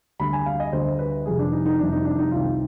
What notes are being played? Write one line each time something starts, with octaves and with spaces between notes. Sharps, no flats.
D2 D3 G3 B5
G#5
F5
D#5
D2 D3 G3 C5
B4
F1 F2 C3 G3 G#4
D4
D#4
D#4
F1 F2 C3 G3 D4
D#4
D4
D#4
C2 C3 D#3 F4